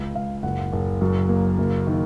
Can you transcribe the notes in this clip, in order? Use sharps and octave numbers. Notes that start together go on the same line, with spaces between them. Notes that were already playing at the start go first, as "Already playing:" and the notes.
Already playing: C#2
C#2 F5
F#1 F#5
F#1
F#2
A#3
F#1
D#3